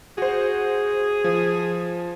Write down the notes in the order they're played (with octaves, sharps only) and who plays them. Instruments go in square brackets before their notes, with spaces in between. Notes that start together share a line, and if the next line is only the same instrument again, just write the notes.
[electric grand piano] F#4 C5 [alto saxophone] G#4
[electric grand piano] F3